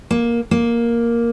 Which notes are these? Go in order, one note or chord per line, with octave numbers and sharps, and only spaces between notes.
A#3
A#3